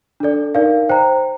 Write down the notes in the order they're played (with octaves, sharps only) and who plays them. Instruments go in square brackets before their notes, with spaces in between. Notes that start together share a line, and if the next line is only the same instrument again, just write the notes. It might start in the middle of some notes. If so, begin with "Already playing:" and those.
[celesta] D4 A4 D5
D#4 A#4 D5 F5
C5 G5 A#5